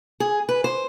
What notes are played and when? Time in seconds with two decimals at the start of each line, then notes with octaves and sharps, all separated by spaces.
0.20 G#4
0.49 B4
0.64 C5